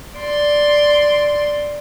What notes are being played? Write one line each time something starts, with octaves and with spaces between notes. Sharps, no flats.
D5 C6